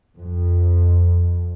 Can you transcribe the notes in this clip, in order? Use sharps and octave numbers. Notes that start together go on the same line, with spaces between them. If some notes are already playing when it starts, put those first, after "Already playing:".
F2